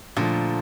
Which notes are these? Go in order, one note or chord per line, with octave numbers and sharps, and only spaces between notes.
A#2 D3 F3 A3